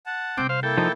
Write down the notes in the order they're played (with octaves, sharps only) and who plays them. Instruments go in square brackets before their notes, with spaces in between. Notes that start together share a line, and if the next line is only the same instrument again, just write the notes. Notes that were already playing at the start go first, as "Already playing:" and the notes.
[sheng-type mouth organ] F#5 A5
[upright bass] C3 G3 [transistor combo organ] C4 G5 D6
[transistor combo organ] C5 F5
[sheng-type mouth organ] A#3 E4 [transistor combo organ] A4 G5
[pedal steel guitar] F3 D#4